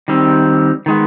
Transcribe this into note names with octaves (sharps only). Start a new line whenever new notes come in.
D#3 G3 C4
D#3 G#3 B3